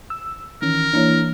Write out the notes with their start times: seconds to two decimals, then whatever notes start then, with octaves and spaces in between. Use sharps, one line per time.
0.10 E6
0.62 D#3 E3 C#4 A#4
0.93 E3 A#3 D4 E4 C#5